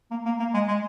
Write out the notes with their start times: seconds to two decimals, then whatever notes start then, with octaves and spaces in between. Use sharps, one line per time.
0.11 A#3
0.26 A#3
0.39 A#3
0.54 G#3
0.68 G#3